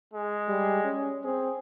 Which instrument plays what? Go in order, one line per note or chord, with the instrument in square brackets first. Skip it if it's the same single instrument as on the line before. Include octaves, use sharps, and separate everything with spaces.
[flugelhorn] G#3
[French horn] G3
C#4
[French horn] C4 [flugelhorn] G#4